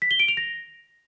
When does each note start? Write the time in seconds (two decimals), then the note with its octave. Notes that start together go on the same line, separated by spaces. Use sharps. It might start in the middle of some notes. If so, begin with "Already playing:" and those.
0.02 B6
0.11 G7
0.20 D7
0.28 F7
0.37 A#6